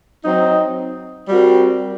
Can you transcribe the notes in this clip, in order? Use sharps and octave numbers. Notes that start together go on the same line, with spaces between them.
F#3 C4 D#4
G3 C4 F#4 A#4